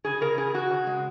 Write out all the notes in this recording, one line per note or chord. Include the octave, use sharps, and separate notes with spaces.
C#3 G#4
C#3 A#4
C#3 G#4
C#3 F#4
C#3
G#3